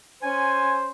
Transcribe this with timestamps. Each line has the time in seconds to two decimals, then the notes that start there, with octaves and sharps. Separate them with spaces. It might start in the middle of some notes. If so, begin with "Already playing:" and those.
0.23 C#4 C5 G#5